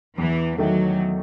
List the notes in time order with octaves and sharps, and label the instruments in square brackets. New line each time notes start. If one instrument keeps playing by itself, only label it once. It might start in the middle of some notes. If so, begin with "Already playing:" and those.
[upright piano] E2 [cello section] E3
[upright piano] D#3 A3 [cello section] F#3